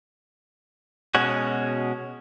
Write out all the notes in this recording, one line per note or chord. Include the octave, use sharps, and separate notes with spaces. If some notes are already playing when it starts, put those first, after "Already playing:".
B2 G#3 C#4 F#4